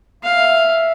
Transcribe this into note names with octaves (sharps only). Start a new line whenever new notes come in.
E5 F5